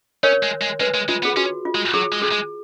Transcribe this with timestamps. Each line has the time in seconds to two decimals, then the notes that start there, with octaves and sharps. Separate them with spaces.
0.23 C#4 A#4 C#5
0.43 G#3
0.62 G#3
0.80 G#3 B4
0.94 G#3
1.09 G#3 F4
1.23 B3 G#4
1.37 C#4 F#4
1.65 F4
1.75 G#3
1.94 F#3 G#4
2.13 G#3
2.22 G#4
2.31 G#3